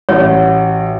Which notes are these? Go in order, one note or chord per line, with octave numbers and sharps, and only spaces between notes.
A1 F#4 C#5